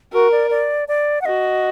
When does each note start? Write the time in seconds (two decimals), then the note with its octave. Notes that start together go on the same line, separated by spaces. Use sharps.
0.13 F#4 A#4
0.32 D5
0.51 D5
0.88 D5
1.21 F#5
1.25 F#4 D#5